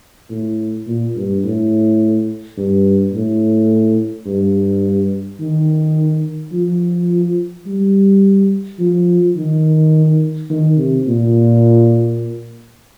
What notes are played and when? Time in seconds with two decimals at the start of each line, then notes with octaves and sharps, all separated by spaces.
0.30 A2
0.87 A#2
1.16 G2
1.44 A2
2.57 G2
3.14 A2
4.26 G2
5.40 D#3
6.53 F3
7.66 G3
8.79 F3
9.36 D#3
10.50 D#3
10.78 C3
11.07 A#2